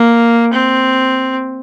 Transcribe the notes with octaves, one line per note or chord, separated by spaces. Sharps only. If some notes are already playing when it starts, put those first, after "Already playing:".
Already playing: A#3
C4